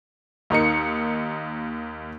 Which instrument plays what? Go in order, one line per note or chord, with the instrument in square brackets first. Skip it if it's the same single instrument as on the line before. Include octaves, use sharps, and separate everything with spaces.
[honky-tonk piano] D#2 D#4 A#4 C#7